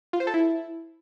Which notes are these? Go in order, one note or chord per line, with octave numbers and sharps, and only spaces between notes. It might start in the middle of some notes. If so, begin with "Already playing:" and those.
F4
C5
A4
E4